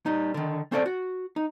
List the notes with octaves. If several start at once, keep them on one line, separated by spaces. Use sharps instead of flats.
G3 D#4
D3 D#3
C4 C#4 A4 C5 D5
F#4
D#4